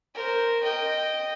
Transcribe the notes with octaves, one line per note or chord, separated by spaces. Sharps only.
A#4 C5
D#5 G5